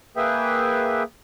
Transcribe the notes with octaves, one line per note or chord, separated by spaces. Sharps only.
A#3 G#4 B4 E5 G5